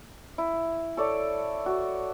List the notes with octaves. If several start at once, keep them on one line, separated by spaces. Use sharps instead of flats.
E4
A4 C#5 D5
F#4